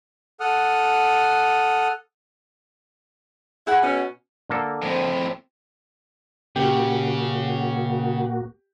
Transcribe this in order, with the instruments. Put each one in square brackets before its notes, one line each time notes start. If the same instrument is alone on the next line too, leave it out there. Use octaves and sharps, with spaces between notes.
[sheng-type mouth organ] A4 F#5 D#6 F6
[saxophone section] E4 [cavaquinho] G#4 F#5 G#5
[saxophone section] B2 C#4
[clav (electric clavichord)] D3 A#3 A4
[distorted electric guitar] F2 A2 [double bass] C4
[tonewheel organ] A#2 A#3 F#4 [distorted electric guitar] C#3 [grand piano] G4